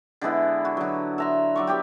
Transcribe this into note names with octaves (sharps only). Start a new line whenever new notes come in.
D3 G#3 B3 E4
F#4
D3 F#3
E5 A#5 C6
F#3 D5 C#6
B3 G4 D5 G5